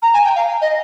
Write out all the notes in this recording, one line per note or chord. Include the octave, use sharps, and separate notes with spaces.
A#5
G#5
G5
F5
D#5